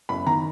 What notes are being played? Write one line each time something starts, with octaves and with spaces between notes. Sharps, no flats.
F#1 B5
D#3 A#5